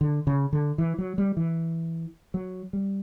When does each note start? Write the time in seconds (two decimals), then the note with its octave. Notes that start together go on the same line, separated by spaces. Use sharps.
0.01 D3
0.27 C#3
0.53 D3
0.78 E3
0.98 F#3
1.18 G3
1.37 E3
2.34 F#3
2.73 G3